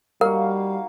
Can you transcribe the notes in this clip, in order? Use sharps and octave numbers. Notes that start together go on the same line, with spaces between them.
G3 A#3 D#4 F#4 A#4 F5